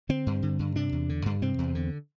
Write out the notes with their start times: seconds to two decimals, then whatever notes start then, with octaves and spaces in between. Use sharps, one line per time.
0.09 D3 C4
0.27 G2
0.42 D3
0.59 G2
0.76 C3 D4
0.93 E2
1.09 D3
1.26 G2
1.42 C3 C4
1.58 E2
1.75 D3